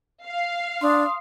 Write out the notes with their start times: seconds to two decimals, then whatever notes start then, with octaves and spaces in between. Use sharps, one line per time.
0.25 F5
0.81 D4 C6 D#6